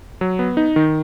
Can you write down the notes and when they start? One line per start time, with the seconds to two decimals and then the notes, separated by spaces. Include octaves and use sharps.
0.21 F#3
0.39 B3
0.57 D#4
0.76 D#3